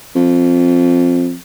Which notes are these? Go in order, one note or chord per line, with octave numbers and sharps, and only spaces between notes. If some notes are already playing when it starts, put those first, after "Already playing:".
F2